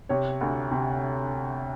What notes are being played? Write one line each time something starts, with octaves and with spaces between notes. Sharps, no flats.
C3 C#5
D2
C3